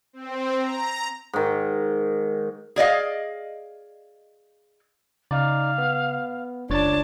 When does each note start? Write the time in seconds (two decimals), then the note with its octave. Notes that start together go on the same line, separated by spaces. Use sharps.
0.13 C4
0.59 A#5
1.33 G#2 D#3
2.76 G#4 D5 D#5 F5
5.31 C#3 D#4 D5 F5
5.78 B3
6.70 F1 C#2 D4 C#5 A5 A6